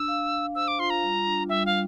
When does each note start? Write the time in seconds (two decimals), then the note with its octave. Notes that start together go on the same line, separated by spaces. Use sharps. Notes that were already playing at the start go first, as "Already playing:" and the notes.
Already playing: D4 E6
0.08 F5
0.32 F5
0.55 C5 E6
0.68 D6
0.79 F4 C6
0.90 A#5
1.03 G3
1.27 D4
1.49 G3 E5
1.66 F5